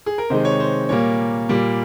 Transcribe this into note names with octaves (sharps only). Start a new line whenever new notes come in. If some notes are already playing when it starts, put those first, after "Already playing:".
G#4
A#4
C3 D#3 G#3 C5
C#5
C5
A#2 G3 A#3 C#5
A#2 G3 A#3